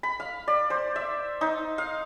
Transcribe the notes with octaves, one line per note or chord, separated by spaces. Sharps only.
B5
F5
D5
C5
E5
D#4
F5